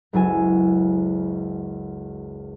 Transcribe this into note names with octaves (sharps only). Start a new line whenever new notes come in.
F#1 C#2 F#3 E4 A4 G#5